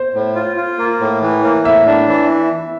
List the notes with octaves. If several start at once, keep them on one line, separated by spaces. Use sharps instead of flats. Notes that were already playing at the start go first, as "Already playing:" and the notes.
Already playing: C5
A2
F4
F4
A#3
A2
E3
A#3
A2 E5
D4
E3